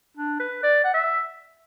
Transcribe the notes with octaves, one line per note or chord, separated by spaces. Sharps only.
D4
B4
D5
F#5
E5